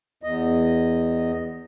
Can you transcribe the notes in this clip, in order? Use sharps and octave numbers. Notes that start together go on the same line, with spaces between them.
E2 D#5